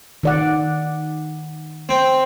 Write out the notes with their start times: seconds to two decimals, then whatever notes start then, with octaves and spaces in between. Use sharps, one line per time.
0.23 D#3 D5 F#5
1.89 C4 G5